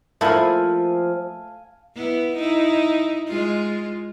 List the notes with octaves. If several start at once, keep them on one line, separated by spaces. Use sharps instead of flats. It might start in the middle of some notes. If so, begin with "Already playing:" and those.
F3 A3 A#3 E4 A4 F5 G#5 A5
B3 E4
D#4 E4
G#3 F4